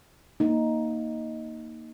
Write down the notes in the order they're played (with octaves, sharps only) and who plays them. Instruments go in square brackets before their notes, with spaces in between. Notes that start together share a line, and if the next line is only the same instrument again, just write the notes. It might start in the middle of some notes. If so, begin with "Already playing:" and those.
[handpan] A#3 D#4